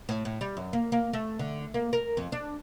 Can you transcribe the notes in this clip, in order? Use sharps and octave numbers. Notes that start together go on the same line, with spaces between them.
A2
A2
G3
F#2
A#3
A#3
A3
D3
A#3
A#4
F2
D4